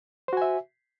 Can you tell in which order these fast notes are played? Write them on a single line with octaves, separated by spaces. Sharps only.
C5 F#4 G#5 E5